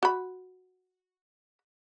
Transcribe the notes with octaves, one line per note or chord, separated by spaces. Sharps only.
F#4 B5